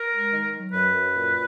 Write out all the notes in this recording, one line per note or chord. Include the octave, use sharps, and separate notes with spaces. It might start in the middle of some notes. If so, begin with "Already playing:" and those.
Already playing: A#4
G#3
D#3
F#3
F#2 B4
F#2
A#2